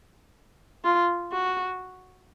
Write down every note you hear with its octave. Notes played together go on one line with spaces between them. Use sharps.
F4
F#4